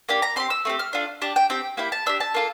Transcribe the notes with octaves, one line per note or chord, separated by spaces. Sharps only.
A#3 D4 G4
A#5
C4 G4 C6
E6
A3 C4 G4
F6
D4 F4 A4
D4 G4 A5
G5
C4 G4 G5
A#3 E4 G4 G5
A5
D4 G4 E6
A5
A#3 F4 A4